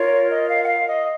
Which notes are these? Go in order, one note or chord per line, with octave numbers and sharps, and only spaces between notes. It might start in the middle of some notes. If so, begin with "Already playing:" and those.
Already playing: F4 A#4 C#5
D#5
F5
F#5
F5
D#5